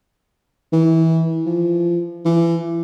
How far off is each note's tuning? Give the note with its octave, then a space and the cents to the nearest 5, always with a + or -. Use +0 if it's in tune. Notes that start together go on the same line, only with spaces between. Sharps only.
E3 -20
F3 -25
E3 +30